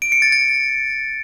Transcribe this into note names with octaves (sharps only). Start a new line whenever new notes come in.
D7
C#7
A6
A6